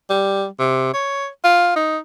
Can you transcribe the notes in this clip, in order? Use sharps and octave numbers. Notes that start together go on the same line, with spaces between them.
G3
C3
C#5
F4
D#4